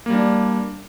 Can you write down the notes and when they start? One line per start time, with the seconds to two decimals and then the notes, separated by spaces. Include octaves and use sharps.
0.06 A#3
0.10 G3
0.14 D4